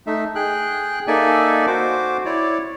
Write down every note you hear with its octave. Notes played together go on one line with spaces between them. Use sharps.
A3 D#4 E5
G#4 G5 F#6
A#3 D#4 A4 D5 E5 G#5
F#4 C5 D6
E4 C#5 D5